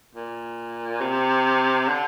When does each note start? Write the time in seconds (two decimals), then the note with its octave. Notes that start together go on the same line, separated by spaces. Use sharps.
0.15 A#2
1.01 C3
1.88 D3